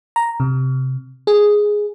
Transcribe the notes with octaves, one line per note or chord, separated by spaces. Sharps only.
A#5
C3
G#4